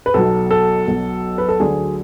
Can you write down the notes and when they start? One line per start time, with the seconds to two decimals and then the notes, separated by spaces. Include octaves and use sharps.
0.06 B4
0.14 B1 B2 F#3 A4
0.51 A4
0.87 B1 B2 F#3
1.38 B4
1.49 A4
1.60 D2 D3 F#3 G#4